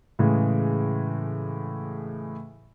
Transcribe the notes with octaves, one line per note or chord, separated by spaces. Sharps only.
A2 C#3 E3 G#3